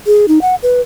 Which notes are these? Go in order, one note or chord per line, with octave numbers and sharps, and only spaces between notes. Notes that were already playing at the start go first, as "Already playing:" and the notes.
G#4
D#4
F#5
B4